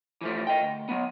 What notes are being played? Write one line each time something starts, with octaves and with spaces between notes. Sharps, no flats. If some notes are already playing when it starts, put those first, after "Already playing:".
E3 F3 A3
D#5 G5
D2
F#3 B3